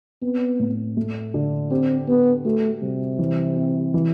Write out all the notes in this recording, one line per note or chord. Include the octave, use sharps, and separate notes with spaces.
B3 C4
A2
A3
D3
C4 G4
B3 G4
A3 F#4
C3 G3
E3
C4
E3